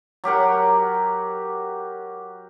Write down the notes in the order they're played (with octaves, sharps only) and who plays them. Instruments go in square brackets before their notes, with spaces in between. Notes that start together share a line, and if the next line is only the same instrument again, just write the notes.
[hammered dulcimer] F#3 G4 A#4 F#5